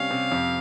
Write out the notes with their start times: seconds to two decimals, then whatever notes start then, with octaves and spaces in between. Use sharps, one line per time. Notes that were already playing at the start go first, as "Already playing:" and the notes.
Already playing: C3 G3 C#4 F5
0.11 C3
0.32 F2